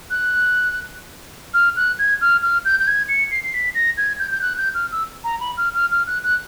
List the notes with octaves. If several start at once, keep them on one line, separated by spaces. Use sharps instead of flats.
F#6
F6
F#6
G#6
F6
F6
G6
G6
G#6
C#7
C7
C7
B6
A#6
G#6
G6
G6
F#6
G6
F6
E6
A#5
B5
F6
F6
F6
F#6
F#6